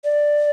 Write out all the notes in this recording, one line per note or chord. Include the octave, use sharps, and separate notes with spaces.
D5